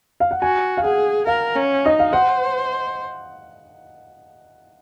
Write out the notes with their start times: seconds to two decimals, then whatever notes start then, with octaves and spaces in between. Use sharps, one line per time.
0.20 F5
0.31 F#5
0.42 F#4 G#5
0.77 F5
0.84 G#4 F#5
1.27 A#4 F5
1.55 C#4
1.85 D#4 D#5
1.99 F5
2.13 C5 F#5